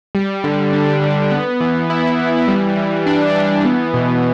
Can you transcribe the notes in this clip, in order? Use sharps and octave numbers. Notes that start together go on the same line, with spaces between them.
G3
D3
D4
D3
B3
E3
E4
E3
G3
E3
D4
E3
B3
B2